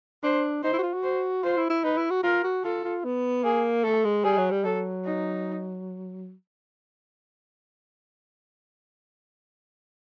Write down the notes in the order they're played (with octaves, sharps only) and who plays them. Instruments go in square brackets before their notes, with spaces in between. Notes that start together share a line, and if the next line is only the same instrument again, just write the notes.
[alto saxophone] D4 [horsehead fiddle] C5
[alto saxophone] D#4 [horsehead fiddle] C5
[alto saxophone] E4
F#4
F4
F#4
[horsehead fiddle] C5
[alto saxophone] F4 [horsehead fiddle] C5
[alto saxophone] E4
E4
[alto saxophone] D#4 [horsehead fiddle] B4
[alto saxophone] E4
F#4
[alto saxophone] F4 [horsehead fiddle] A#4
[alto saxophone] F#4
[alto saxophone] F4 [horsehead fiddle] A4
[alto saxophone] F4
B3
[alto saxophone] A#3 [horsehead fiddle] G#4
[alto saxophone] A3 [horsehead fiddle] A4
[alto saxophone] G#3
[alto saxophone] G3 [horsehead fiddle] G#4
[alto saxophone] F#3
G3
[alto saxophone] F#3 [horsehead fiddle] A4
[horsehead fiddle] D#4